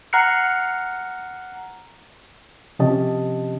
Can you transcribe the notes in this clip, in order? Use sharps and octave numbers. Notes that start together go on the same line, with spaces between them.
F#5 A#5 F6 F#6 C7 C#7
C3 F3 C#4 G4 D#5 A5